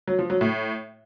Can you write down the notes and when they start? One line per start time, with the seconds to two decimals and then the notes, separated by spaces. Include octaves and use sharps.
0.08 F#3
0.19 F3
0.30 F#3
0.41 A2